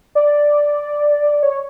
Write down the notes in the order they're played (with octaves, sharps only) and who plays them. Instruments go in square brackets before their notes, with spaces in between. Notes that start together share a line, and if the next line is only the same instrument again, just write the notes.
[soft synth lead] D5
C#5